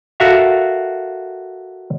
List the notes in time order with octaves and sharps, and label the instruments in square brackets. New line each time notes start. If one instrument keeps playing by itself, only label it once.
[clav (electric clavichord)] F#4 A4 A#4 E5 F5